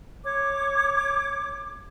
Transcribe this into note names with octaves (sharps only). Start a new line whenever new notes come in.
C#5 D6